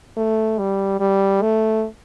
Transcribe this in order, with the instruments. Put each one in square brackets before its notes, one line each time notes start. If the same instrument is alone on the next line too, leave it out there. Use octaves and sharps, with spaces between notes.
[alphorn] A3
G3
G3
A3